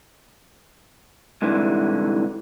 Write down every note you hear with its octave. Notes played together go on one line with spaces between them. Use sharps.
C2 G#2 D3 E3